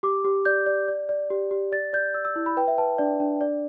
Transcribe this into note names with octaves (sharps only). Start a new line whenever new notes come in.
G4 D6
G4
D5 G6
D5
D5
D5
G4
G4
D5 A6
D5 G6
D5 E6
E6
E4
B5
B4 G5
E5
B4 A5
D4 D5
D4
D5